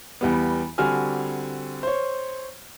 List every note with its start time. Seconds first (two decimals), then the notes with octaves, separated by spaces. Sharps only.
0.21 E2 G3 B3
0.78 D3 G3 C4 F#4 G#5 F6
1.83 C5 C#5